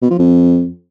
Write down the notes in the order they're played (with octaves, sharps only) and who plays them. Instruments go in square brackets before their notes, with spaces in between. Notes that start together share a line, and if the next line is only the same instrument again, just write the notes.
[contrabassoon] B2
F3
F2